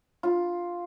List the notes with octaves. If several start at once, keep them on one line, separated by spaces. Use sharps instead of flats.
F4